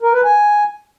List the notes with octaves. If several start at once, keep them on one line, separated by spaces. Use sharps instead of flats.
A#4
B4
G#5